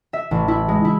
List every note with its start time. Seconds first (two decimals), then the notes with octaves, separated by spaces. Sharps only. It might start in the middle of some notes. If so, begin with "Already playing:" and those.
0.13 E5
0.31 A1
0.48 E4
0.68 G#3
0.85 E4